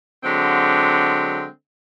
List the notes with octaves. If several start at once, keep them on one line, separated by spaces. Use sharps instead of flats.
D3 F#3 G#3 C4